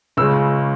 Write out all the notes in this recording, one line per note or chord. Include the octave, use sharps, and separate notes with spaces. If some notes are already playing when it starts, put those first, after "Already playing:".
C#2 C#3 G#3 E6